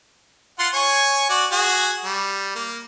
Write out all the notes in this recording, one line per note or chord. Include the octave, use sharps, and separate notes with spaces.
F4 F#5 C6
C#5 G#5 C#6
F#4 D5
F#4 G#4
G3
A#3